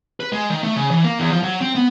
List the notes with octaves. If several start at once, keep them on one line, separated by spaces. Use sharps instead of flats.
B4
G#3
D#3
A3
C#3
E3
A#3
E2
F3
F#3
C4
B3